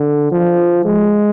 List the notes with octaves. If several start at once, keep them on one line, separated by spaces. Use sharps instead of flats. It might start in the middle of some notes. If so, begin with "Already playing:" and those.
Already playing: D3
F3
G#3